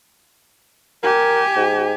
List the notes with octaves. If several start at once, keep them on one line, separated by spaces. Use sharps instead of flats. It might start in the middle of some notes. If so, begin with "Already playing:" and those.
G4 A#4 G#5
G#2